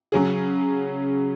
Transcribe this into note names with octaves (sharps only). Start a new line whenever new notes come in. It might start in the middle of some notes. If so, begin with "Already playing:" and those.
C#3 F#3 C#4 G#4